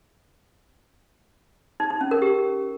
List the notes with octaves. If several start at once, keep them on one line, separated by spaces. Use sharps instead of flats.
D#4
D#4
C#4
A#4
G4